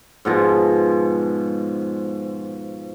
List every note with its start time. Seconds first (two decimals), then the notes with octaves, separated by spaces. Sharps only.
0.25 G#2 B2 F3